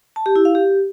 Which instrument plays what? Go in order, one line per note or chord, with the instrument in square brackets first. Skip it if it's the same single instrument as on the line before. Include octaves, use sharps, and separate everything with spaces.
[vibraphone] A5
G4
E4
F5
G4